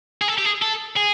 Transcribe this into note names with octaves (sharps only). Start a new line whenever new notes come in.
G#4
A4
G4
G#4
A4
G#4